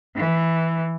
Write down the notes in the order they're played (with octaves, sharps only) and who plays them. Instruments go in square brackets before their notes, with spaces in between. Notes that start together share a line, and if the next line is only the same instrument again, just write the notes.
[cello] E3